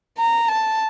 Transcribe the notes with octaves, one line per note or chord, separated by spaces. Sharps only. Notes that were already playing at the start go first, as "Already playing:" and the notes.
A#5
A5